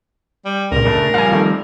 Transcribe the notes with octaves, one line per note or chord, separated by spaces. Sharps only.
G3
C#2 A#2 A#4
C#3 A3 D4
F3 G3 C4 F5 G#5
D#3 A3